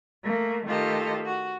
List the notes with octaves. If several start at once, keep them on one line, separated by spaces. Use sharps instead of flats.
A3 A#3
D#3 A3 F4 G4 A4 D#5
F#4